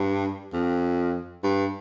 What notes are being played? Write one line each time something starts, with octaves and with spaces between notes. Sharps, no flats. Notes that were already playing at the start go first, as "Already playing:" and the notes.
Already playing: G2
F2
G2